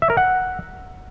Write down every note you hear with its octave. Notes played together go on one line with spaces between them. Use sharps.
E5
A#4
F#5